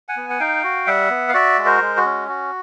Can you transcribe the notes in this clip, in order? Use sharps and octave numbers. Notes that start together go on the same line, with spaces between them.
F#5 G#5
B3
F#5
D#4 F5 G5
F#4
G3 E5 F#5
B3
F5
F#4 D5 E5
G#3
A#4 C5
G#3
F#4
C#4
F#4